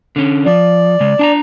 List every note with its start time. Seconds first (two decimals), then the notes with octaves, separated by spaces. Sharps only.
0.16 D3 C#4
0.46 F3 D5
1.00 C#3 G#3
1.19 D4 A5 A#5